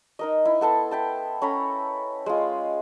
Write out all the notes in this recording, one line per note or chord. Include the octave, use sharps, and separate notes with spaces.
D#4 A#4 D#5
E4
B3 A4 A5 C6
E5 G5 A5
C#4 A4 A#5 B5
G#3 F4